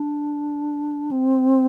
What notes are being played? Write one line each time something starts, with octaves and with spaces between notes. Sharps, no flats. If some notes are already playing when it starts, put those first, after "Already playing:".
Already playing: D4
C4